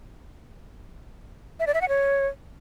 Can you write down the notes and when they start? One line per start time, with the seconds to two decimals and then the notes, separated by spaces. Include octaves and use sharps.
1.60 E5
1.67 D5
1.74 E5
1.81 F#5
1.89 C#5